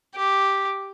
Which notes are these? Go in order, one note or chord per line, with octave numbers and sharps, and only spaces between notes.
G4